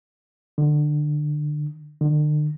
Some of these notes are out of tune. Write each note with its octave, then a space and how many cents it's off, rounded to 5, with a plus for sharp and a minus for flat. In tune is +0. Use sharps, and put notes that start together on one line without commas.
D3 +25
D3 +40